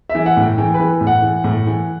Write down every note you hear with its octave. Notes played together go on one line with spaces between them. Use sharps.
E5
E3
F#5
A2 G5
E3 G5
B4
E3
A2
F#5
E3
A2
E3